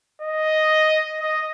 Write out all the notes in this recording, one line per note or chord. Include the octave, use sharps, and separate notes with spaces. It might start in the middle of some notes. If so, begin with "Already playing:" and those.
D#5
D#5